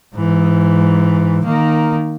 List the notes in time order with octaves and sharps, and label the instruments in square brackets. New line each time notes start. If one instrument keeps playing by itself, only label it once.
[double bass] G#2 E3
D#3 A#3